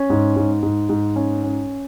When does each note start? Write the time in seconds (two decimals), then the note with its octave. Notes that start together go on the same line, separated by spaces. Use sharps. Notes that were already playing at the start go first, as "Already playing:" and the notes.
Already playing: C#4
0.10 G#2
0.36 G#2
0.63 G#2
0.89 G#2
1.16 C#4
1.44 C#4